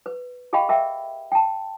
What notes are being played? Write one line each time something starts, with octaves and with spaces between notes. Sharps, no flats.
B4
G4 G#4 D#5 F5 G5 B5
G#4 A#4 E5 G5
G5 A5